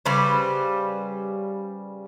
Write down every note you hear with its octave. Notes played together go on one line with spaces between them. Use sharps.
C#3 G3 B4 C5